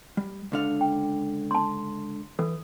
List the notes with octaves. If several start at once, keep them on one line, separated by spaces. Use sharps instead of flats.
G3
C#2 D3 F5
G5
A5 C6
E3 A4